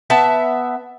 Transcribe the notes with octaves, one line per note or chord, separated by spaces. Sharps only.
B3 E5 A5